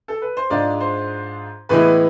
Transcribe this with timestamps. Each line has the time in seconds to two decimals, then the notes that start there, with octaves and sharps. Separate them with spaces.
0.08 A4
0.22 B4
0.37 C5
0.50 G#2 G#3 D4 F4 D5
0.81 C5
1.69 A2 E3 G#3 B3 E4 B4